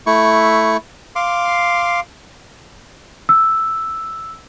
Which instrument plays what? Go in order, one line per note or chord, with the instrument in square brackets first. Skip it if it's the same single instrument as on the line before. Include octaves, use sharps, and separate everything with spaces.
[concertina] A3 E4 C#6
F5 C6 D6
[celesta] E6